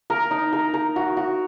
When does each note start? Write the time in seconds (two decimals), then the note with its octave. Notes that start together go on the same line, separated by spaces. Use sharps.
0.10 A#4
0.31 D#4
0.53 A#4
0.74 A#4
0.96 F#4
1.17 F#4